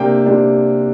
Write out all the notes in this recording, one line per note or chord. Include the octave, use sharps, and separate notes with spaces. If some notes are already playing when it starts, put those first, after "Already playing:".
Already playing: C3 A#3 D4 G5
C3 A#3 D4